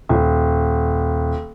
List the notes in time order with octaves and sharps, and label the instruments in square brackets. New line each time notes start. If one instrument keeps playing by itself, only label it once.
[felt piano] D#1